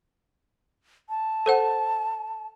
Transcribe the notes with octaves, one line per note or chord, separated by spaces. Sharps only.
A5
A4 C5 F#5